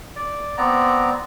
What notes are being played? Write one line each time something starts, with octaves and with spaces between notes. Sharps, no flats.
D5
B3 C4 D5 A#5